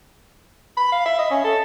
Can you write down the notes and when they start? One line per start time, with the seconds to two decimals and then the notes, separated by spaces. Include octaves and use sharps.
0.77 B5
0.92 F5
1.06 E5
1.19 D#5
1.30 C#4
1.44 A4